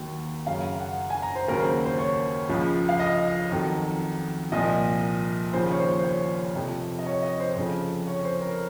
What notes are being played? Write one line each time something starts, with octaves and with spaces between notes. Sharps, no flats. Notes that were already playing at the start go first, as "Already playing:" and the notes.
Already playing: D#2 D#3 F#3
F#2 C#3 F#3 F5
F5
F#5
G#5
A#5
C5
D#2 C#3 F#3 A#4
C5
C5
C#5
C#2 C#3 F3
F5
D#5
F2 D#3 F#3
C2 A#2 F3 D#5
D#2 C#3 F3 C5
C#5
C5
C5
C#5
F2 C3 F3
D#5
C#5
D#5
C5
F2 C#3 F3
C#5
C5
A#4